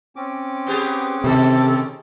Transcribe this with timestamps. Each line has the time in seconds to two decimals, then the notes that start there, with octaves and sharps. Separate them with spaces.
0.16 C4 C#4 D6
0.67 B3 G4 G#4
1.24 C3 D#3 A4